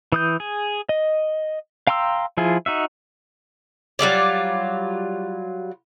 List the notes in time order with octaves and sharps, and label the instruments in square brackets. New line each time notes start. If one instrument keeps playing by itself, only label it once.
[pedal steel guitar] E3 D#6 G6
G#4
D#5
F5 G5 A#5 C6 E6
F3 E4 F4 G#4
D#4 F#4 E5
[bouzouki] F#3 G3 F4 D5